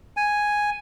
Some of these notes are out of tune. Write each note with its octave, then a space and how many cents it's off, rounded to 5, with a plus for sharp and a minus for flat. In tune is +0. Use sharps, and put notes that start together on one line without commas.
G#5 +0